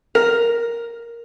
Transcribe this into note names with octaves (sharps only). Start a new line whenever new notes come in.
A#4